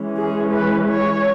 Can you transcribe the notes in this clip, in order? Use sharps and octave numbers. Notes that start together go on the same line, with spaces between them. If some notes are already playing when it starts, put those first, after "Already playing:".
Already playing: E3 G#3 C#4
G#4
B4
C#5